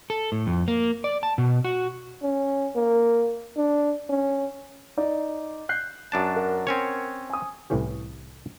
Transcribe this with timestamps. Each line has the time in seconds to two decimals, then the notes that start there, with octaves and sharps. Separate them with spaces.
0.10 A4
0.32 A2
0.47 F2
0.68 A#3
1.04 D5
1.23 A5
1.38 B2
1.65 F#4
2.22 C#4
2.76 A#3
3.57 D4
4.10 C#4
4.97 D#4 D5
5.69 F#6 G6 C7
6.12 F#2 D4 A5
6.36 A#4 F#5
6.67 C4 C#4 C#5
7.30 G#5 D#6
7.70 C2 A2 E3 C#4 G4